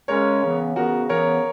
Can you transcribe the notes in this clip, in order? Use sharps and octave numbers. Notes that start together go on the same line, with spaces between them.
C#3 G#3 C#4 A#4 C#5
C#3 E3 B3
C#3 E3 B3 F#4 A#4
C#3 E3 B3 A#4 C#5